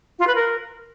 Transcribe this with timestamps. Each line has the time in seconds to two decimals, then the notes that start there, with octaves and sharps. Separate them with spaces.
0.19 F4
0.27 B4
0.35 A#4